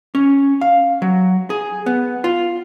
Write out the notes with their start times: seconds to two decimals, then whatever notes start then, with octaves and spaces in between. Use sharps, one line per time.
0.15 C#4
0.61 F5
1.02 F#3
1.50 G#4
1.86 B3
2.24 F4